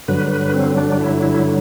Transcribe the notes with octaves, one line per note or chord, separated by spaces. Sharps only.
G2 D3 F#3 B4
B4
C4
D4
E4
E4